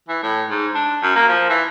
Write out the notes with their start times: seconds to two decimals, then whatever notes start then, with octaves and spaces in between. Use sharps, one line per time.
0.09 E3
0.23 A2
0.50 G#2
0.75 D4
1.02 F#2
1.15 A#3
1.29 F3
1.50 E3